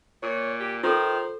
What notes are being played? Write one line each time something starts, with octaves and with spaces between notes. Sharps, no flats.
A#2 C#5
G4
D#3 F4 A4 C5